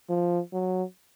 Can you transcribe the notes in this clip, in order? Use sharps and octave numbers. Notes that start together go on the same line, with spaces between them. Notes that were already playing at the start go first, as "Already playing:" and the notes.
F3
F#3